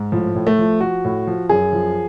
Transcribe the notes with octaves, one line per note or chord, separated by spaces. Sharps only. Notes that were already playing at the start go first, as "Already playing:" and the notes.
Already playing: G#2
A2 F3
A2
A3
F3
F3 F#4
A2
F3
F#2 G#4
F3